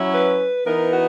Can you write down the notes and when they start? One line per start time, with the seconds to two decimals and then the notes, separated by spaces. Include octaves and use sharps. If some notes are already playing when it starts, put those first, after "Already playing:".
Already playing: F#3 C#4 E4
0.14 B4
0.66 E3 B3 D#4 A#4
0.92 F#4